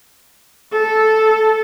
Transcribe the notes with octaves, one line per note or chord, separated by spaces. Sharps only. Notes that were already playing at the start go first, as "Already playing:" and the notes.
A4